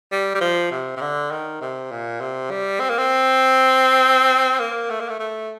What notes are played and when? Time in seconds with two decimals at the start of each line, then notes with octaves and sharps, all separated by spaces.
0.12 G3
0.35 G3
0.41 F3
0.72 C3
0.97 C3
1.02 D3
1.32 D#3
1.61 C3
1.92 A#2
2.21 C3
2.51 G3
2.80 C4
2.90 A#3
2.98 C4
4.60 A#3
4.90 A3
5.00 A#3
5.09 A3
5.20 A3